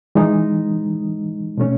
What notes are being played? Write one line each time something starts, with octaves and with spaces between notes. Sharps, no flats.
E3 G#3 D#4
B2 A3 C#4